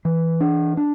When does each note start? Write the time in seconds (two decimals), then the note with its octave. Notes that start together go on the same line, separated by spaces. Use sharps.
0.05 E3
0.41 D4
0.77 D4